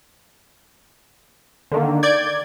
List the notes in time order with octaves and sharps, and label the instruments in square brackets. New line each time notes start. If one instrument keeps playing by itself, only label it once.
[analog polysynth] D3 D#3 A#3
[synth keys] D5 G#6 [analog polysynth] G6